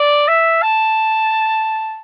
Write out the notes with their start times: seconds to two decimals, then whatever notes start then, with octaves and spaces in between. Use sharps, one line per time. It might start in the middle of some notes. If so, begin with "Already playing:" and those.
Already playing: D5
0.28 E5
0.62 A5